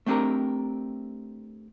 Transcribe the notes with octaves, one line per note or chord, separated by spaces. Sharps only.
A3 C4 D4 G4 A#4